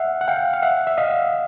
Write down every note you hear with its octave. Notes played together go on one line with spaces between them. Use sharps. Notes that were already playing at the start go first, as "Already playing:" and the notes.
Already playing: E5 F#5
F#5
F5 G5
F5
E5 F#5
E5
D#5 F5